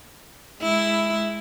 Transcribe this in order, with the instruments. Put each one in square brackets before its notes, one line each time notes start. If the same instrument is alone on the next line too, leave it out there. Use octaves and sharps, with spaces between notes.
[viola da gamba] G#3 E4